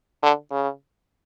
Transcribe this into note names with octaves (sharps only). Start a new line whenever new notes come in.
D3
C#3